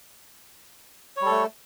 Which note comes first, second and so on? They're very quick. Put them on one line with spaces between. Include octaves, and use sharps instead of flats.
C#5 G3 A4 A3